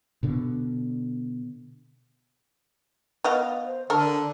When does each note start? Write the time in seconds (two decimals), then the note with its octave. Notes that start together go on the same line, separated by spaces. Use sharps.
0.23 B2 D3
3.24 B3 D#5 F5
3.66 C5
3.90 D3 D4 A4 A#4